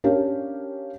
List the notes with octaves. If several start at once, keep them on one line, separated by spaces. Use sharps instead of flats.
C#4 D4 G4 A#4 F5